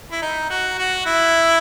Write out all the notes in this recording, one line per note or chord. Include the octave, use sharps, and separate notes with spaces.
E4
D#4
F#4
F#4
E4